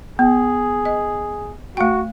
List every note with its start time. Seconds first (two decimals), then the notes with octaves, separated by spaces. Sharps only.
0.19 B3 G#4
0.85 D#5
1.77 A3 F#4 G5